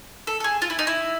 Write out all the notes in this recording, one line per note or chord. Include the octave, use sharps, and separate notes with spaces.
A4
A4
G#4
F4
E4
D#4
E4